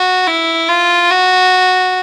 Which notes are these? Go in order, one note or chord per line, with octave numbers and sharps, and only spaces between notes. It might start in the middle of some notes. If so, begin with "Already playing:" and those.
Already playing: F#4
E4
F4
F#4